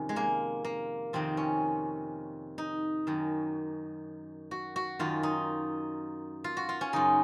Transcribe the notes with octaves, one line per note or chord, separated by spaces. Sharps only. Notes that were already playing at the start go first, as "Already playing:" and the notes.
Already playing: F2 C3 D#3 C#4
G#3
A#3
A#3
F2 C3 D#3 C4
C#4
D#4
F#2 D#3
F#4
F#4
F#2 D#3 F4
D#4
F4
F#4
F4
C#4
F#2 C#3 D#4